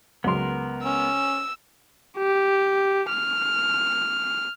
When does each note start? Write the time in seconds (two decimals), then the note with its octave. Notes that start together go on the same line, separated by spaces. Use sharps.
0.24 C#2 F#3 B3 A#4 C6
0.84 C#4 E6
2.18 G4
3.09 F6